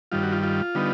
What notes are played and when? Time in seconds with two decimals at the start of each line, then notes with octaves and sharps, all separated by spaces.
0.12 G2 D#3 G3 F4
0.23 F#4
0.32 F4
0.43 F4
0.75 D3 G3 B3 D#4